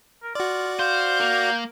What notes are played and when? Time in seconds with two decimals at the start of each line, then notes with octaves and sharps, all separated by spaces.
0.23 A#4
0.35 F4 F#4 D5
0.79 C5 F5 G6
1.20 A#3